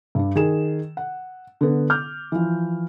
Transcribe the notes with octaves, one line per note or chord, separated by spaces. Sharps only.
G2 D4
D#3 G#4 E7
F#5
D3 B3
D6 F6 G6
E3 F3